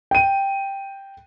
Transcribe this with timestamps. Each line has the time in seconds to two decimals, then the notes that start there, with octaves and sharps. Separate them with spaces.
0.11 G5 D#7